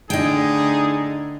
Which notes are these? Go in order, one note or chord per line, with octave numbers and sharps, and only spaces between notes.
A2 D3 D#4 G#4 D#5 G5